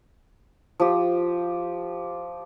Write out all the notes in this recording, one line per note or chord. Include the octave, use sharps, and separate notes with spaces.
F3 G4